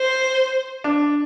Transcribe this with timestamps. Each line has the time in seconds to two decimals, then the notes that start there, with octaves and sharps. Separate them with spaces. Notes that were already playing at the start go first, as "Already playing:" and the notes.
Already playing: C5
0.84 D4